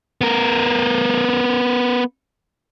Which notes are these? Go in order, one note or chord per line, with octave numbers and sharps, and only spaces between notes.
B3 A#4